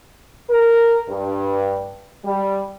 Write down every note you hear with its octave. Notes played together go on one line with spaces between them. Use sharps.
A#4
G2
G3